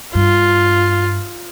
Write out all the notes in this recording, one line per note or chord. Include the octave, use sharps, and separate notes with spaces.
G2 F4